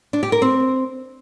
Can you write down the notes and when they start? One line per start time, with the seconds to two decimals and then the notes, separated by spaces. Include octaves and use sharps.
0.13 D4
0.23 G4
0.32 A#4
0.42 C4